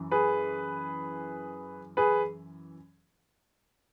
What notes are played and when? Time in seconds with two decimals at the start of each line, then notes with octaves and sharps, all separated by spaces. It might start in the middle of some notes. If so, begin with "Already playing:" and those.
Already playing: F#2 E3
0.11 G#4 B4
1.97 G#4 B4